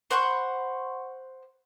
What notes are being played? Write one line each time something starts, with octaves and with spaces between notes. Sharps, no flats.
C5 F#5 B5 C#6